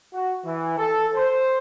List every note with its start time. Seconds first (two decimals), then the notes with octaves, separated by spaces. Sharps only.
0.13 F#4
0.45 E3
0.77 A4
1.15 C5